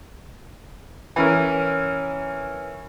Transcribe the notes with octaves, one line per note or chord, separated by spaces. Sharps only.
E3 C#4 A#4